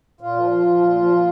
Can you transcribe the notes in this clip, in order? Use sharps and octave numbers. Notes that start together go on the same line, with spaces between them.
A#2 F4
F3
F3
F3
A#2
F3
A#2